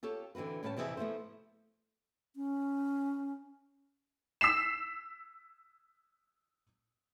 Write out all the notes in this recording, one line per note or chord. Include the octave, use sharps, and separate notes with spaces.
F4 G4 A4 C#5
D3 E3 C4 F#4 B4
A2 G3 C#4 B4 F5 A5
F2 C3 E3 E4 G#4
F3 A3 B3 E4 C5
C#4
E6 B6 C7 E7